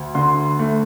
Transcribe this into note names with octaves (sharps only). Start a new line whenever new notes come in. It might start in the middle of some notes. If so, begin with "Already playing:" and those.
Already playing: D2
D3 C6
A3